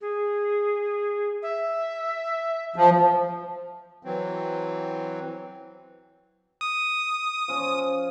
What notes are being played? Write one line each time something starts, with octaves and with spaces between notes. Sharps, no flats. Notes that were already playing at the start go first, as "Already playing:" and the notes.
G#4
E5
F3
E3 F#3 C4
D#6
F3 C#4